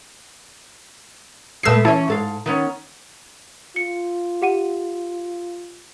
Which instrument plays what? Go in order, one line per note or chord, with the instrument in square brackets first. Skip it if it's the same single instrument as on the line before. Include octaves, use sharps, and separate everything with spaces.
[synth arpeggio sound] A#2 E6 C7 [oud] G#3 A3 B3
[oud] E3 C#4 C#5 [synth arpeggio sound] E4 A5
[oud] G#2 A4 F5
D#3 B3 C#4
[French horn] F4 [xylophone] C#7
[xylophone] G4 F#5 D#7